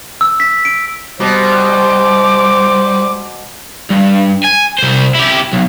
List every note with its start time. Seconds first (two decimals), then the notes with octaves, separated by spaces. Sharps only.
0.21 E6
0.40 B6
0.65 D7
1.20 B2 G3 C5 D6
3.91 G2
4.44 G#5
4.79 C2 C5
5.15 E4 G4
5.53 B1